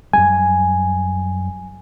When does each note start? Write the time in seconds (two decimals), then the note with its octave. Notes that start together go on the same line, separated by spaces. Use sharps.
0.13 F#2 G3 G#5